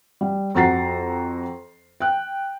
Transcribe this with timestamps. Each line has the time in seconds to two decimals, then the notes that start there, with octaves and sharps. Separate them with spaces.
0.21 G3
0.55 F2 F#4 A#5 A6 C7
2.00 G5 F#6